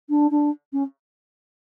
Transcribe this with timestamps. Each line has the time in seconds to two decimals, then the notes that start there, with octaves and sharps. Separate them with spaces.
0.09 D4
0.31 D4
0.72 C#4